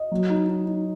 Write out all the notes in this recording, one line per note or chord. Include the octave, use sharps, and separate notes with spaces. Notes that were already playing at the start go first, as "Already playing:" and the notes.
Already playing: D#5
F#3
D#4
D#4
D#4